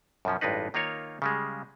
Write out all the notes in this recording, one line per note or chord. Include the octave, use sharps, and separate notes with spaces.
F#2 B2 F3 C#4
A1 G2 G#3 D4 D#4 B4
D#3 A#3 D#4 F4 A#4 C#5
C#3 G3 G#3